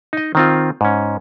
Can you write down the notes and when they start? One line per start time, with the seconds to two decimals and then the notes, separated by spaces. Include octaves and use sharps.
0.13 D#4 D#5
0.35 D#3 C4 F4
0.81 G#2 C#4